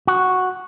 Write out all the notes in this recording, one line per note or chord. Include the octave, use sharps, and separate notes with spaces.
F#4